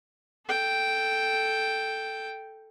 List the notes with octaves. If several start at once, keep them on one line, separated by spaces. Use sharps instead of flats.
A4 G5